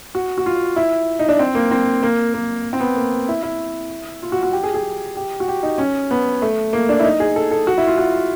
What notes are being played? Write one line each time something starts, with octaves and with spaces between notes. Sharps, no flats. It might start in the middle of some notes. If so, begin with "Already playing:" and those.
F#4
F#4
F4
E4
D#4
D4
C4
A#3
C4
A#3
A#3
C4
B3
A#3
E4
E4
F4
F#4
F#4
G4
G#4
G#4
G4
F#4
G4
D#4
C#4
B3
A3
A#3
D4
E4
D#4
G#4
A4
A4
F#4
E4
F4
F#4